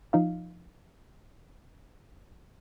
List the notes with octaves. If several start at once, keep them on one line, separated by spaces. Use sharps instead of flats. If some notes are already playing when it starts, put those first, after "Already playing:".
F3 D#4 F5